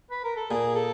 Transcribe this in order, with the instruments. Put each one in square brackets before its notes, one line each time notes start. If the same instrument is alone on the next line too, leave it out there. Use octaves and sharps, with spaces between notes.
[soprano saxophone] B4
A#4
A4
[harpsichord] A#2 [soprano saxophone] G#4
[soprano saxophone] A4